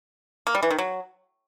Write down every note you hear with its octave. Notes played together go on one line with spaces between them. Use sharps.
A#3
G3
E3
D#3
F#3